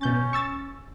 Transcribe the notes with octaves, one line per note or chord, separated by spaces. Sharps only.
B2 C#4 G6 A6
C#6 E6 A6